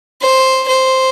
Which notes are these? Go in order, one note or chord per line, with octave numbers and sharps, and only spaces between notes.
C5
C5